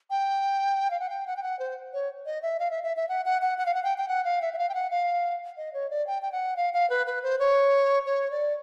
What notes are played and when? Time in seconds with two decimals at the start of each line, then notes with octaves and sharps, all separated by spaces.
0.10 G5
0.91 F5
1.00 F#5
1.10 G5
1.27 F#5
1.37 G5
1.43 F#5
1.59 C5
1.93 C#5
2.26 D#5
2.42 E5
2.60 F5
2.71 E5
2.84 E5
2.97 E5
3.09 F#5
3.25 F#5
3.42 F#5
3.58 F#5
3.66 F5
3.75 F#5
3.84 G5
3.98 G5
4.08 F#5
4.25 F5
4.42 E5
4.54 E5
4.58 F5
4.69 G5
4.75 F#5
4.91 F5
5.57 D#5
5.74 C#5
5.90 D5
6.07 G5
6.22 G5
6.32 F#5
6.57 F5
6.74 F5
6.90 B4
7.07 B4
7.23 C5
7.39 C#5
8.06 C#5
8.31 D5